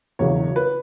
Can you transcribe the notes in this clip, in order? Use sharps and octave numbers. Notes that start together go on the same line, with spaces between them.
E1 E2 C#3 F#3 C#5
B4